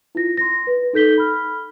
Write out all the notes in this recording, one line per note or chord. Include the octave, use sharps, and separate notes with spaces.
E4 F4 A#6
C6 A#6
B4
D#4 A4 G6 B6 G7
B5 F6